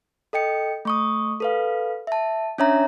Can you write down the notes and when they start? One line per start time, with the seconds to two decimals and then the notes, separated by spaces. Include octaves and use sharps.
0.33 A4 D#5 G5 C#7
0.85 A3 C#6 D#6
1.40 A4 B4 F5
2.07 E5 A5
2.58 C#4 D4 C#5 E5 A#5